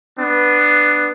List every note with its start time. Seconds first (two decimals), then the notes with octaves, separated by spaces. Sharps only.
0.19 B3 D4